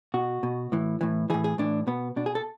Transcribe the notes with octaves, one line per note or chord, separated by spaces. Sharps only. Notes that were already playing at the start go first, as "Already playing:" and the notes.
B2 F#4
B2
A2 E3
A2 E3
A2 E3 G#4
G#4
A2 E3 D4
B2 B3
B2 D4
G#4
A4